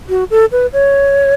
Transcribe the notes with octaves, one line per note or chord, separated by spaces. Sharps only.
F#4
A4
B4
C#5